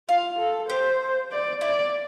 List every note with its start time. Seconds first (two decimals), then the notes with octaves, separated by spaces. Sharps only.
0.09 F4 F5
0.39 A4
0.69 G4 C5
1.32 D5
1.61 E4 D5